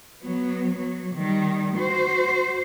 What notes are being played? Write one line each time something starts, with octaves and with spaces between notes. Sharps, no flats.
F#3 B3
F#3
D#3 G3
F#4 C5